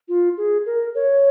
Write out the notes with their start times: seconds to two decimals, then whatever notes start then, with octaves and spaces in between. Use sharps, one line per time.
0.09 F4
0.37 G#4
0.66 A#4
0.95 C#5